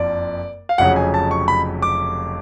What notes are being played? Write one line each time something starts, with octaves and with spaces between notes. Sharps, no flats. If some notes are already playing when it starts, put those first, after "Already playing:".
Already playing: F#1 F2 F3 D5
F5
F1 F2 C#3 F#3 F#5
G#5
A5
C#6
B5
D6